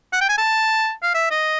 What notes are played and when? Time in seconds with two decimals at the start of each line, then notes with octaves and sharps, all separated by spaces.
0.12 F#5
0.21 G5
0.29 G#5
0.38 A5
1.03 F5
1.14 E5
1.31 D#5